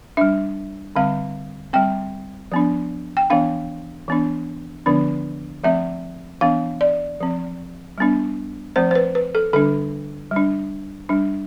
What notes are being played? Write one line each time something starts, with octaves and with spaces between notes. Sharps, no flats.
G3 D4 E5
D3 G3 C4 F5
G3 C4 G5
F3 B3 D4
G5
E3 B3 D4 F5
E3 B3 D4
D3 F3 B3 D4
F3 A3 C4 E5
E3 B3 D4 F5
D5
F3 C4
G3 B3 D4
F3 A3 C4 C5
C5
B4
B4
A4
D3 G3 D4 A4
G3
D4
G3 D4